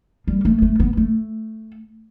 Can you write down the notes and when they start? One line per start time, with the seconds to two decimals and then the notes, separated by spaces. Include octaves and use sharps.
0.27 G3
0.45 A3
0.62 A3
0.80 B3
0.97 A3